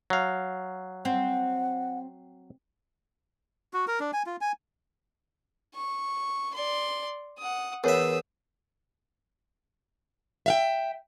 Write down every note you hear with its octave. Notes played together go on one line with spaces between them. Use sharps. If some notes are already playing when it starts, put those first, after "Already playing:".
F#3 F5
C4 F#5
F#4
A#4
D4
G#5
F4
G#5
C#6
D5 C6
F#5 D#6
E2 A#4 C#5 E5 D#6 E6
E5 F5 G5